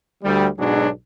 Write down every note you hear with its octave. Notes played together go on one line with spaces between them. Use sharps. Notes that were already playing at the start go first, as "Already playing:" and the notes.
D2 G3
B1 G#2 B2 F#3 D4 G#4